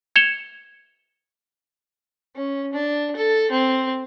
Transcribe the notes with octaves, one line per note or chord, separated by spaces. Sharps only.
G#6 C#7 E7 F7 G7
C#4
D4
A4
C4